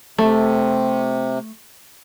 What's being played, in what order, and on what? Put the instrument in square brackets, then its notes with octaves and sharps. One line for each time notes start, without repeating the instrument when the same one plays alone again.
[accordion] C3 [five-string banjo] A3